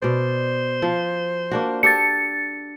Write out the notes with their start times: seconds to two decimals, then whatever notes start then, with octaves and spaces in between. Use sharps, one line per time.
0.02 B2 C5 D5
0.82 F3
1.51 A#3 D4 F#4
1.83 D4 G4 A4 A6 C#7